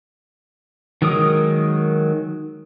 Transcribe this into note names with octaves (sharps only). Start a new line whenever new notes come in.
D#3 F#3 G#3 A#4 D#6